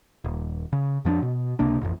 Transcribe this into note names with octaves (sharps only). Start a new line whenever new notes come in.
D#1
C#3
F2 F3 C#4 D4
B2
C#2 C3 A#3 D4
A1 F2 G#2